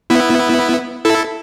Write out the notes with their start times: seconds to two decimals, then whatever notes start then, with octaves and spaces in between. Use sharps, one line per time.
0.10 B3 E4
1.05 E4 A4